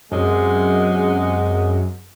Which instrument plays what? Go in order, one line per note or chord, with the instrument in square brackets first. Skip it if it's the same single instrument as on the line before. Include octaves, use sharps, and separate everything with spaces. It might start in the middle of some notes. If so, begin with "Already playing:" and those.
[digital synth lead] F#2 [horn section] C3 G#3 F#5